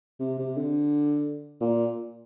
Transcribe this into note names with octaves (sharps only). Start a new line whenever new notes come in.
C3
C3
D3
A#2